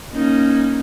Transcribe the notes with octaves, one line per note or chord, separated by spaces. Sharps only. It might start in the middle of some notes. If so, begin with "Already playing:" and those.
A#3 C#4 D#4